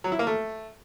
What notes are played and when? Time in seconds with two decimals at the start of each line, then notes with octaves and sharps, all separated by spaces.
0.04 F#3
0.12 E4
0.19 A#3
0.27 A3